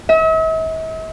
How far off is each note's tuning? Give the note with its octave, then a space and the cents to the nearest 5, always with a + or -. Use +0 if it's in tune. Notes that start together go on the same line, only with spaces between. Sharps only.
E5 -45